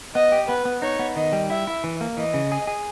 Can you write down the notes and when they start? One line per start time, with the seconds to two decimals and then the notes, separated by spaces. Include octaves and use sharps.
0.15 B3 D#5
0.32 G4
0.49 B3 B4
0.65 B3
0.82 D#4 C#5
0.99 B3
1.16 D#3 D#5
1.33 G3
1.50 E4 E5
1.67 E4
1.84 E3
2.01 A#3
2.17 E3 D#5
2.34 C#3
2.52 G#4
2.67 G#4